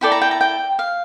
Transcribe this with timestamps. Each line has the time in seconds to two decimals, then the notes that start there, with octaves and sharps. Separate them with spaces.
0.01 E4 A4 D5 G5
0.12 A#5
0.21 G5
0.31 A#5
0.41 G5
0.79 F5